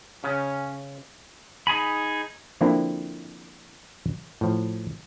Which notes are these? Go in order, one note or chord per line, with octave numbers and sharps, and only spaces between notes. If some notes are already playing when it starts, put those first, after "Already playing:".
C#3 C#4
D#4 G#4 G#5 B5
D3 F3 A#3 C4 D4 E4
A2 F3